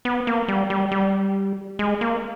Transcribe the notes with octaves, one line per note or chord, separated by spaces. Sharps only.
B3
A#3
G3
G3
G3
G#3
A#3